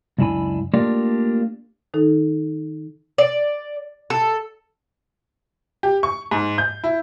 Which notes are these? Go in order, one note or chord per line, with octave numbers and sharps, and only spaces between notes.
C#2 F#2 D4 E4 G#5 B5
A3 A#3 D4 F4 G4 D5
D#3 D#4 A4
D5
A4
G4
C#6
G#2
G6
E4